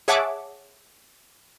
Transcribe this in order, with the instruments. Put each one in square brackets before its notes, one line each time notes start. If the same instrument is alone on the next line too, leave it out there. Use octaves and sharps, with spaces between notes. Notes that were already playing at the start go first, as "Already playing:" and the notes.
[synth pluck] G#4 C#5 E5 F#5 A5 D6